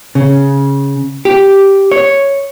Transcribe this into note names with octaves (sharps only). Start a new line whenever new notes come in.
C#3
G4
C#5